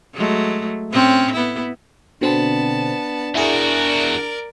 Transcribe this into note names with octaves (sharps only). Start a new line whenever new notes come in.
F#3 G#3 A3
A2 C4 C#4
B3 E4
B2 D3 B3 C4 D4 A5
E2 E4 F#4 G#4 A#4 D5